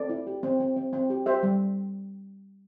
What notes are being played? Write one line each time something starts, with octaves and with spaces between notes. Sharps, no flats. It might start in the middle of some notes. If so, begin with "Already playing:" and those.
Already playing: C4 A4 D5
E4
G4
C4
C4
C4
C4
G4
G4 C5 E5
G3